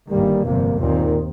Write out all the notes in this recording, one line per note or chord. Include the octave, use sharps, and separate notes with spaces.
G1 G2 D#3 G3 A#3
G1 F2 C3 A#3
D#2 A#2 D#3 C4